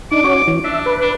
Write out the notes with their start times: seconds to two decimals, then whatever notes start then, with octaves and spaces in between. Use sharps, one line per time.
0.11 D4 D#4 D6
0.24 C#4 F#4 C#5
0.47 E3
0.64 D4 E5
0.86 B4
1.01 D4